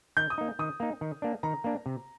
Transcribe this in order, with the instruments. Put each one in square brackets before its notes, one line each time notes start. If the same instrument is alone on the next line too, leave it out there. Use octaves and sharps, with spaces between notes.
[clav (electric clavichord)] D#3 [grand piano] G6
[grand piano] D#6
[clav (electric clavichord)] A#3 D#4
[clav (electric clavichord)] D#3 [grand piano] D#6
[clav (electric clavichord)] A#3 D#4
D#3
A#3 D4
[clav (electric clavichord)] D#3 [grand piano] A#5
[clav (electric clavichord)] A#3 D4
C3